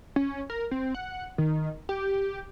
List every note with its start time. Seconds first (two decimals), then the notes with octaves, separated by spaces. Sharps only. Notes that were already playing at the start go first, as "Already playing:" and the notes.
0.16 C#4
0.50 A#4
0.71 C4
0.95 F#5
1.38 D#3
1.89 G4